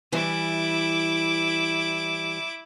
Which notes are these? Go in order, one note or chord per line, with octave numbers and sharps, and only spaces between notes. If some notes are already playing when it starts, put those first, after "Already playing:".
E3 G3 E4 D6